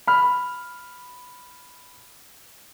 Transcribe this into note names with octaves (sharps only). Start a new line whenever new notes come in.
B5 F6